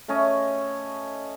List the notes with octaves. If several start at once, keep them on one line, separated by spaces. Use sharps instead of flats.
A3 C#4 C#5 D#5